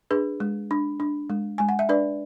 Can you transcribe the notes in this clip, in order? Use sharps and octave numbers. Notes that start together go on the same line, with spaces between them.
D4 G#4 B4
G#3
D4
D4
G#3
G#3 G#5
F#5
E5
D4 B4 D5